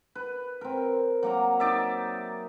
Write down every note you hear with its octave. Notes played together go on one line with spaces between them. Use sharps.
B4
C4 A#4
F#3 A#3 A#5
D#4 D5 E5